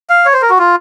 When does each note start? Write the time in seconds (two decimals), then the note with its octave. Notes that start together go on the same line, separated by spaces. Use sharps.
0.10 F5
0.25 C#5
0.33 C5
0.42 A#4
0.50 F#4
0.59 F4